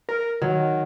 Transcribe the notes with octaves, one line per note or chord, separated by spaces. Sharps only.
A#4
D#3 F#3